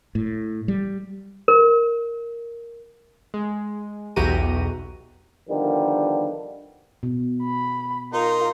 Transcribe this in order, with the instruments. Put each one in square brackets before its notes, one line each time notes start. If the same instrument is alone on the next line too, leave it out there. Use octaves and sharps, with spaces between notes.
[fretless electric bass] A2
G3
[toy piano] A#4
[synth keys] G#3
B1 E2 F#4 G4 A#5 D#7
[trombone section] D3 D#3 F3 G3 B3
[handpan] B2
[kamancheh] B5
[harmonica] D#4 C6 [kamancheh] F4 A#4